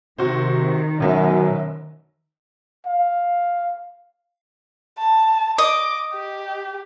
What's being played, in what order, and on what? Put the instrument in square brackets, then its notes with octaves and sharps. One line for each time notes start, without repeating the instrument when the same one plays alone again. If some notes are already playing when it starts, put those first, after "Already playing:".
[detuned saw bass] C3 [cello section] D#3 [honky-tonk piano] F#4 C5
[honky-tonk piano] F1 F#3 E5 [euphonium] F#2 [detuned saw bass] B2
[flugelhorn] F5
[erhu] A5
[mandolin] D#5 [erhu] D6
[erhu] G4